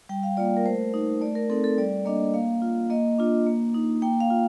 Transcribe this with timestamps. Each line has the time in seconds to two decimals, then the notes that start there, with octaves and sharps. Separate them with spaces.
0.09 G3 G5
0.23 F5
0.37 A#3 F4 D5
0.57 A#4
0.65 A3 C5
0.94 D#4
1.21 A3 D5
1.35 A#4
1.50 C4 D#4 A4
1.64 A4
1.78 G3 D5
2.05 A#3 D4 D#5
2.34 A#3 F5
2.62 F4
2.90 A#3 D#5
3.18 D4 F4
3.46 A#3
3.74 D#4
4.02 A#3 G5
4.20 F5
4.30 F4